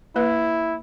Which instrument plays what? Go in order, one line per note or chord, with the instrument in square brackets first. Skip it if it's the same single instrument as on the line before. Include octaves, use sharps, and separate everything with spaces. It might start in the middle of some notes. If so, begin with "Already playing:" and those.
[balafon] A#3 B4 [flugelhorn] E4